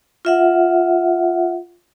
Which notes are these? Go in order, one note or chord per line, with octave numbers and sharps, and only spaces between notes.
F4 E5 F#5